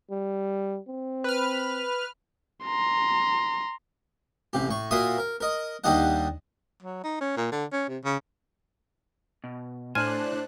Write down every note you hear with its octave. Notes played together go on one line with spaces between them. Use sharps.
G3
C4
B4 F6
A#5 C6
A1 C3 G4
A2 C#6
A#2 F#4 A#4 E5 C6 D#6
A#4
A#4 D#5
D#2 G3 D4 G4 D#5 F#5
F#3
D#4
C#4
A#2
D3
C#4
C3
C#3
B2
A2 D4 C5 G#5 F6 F#6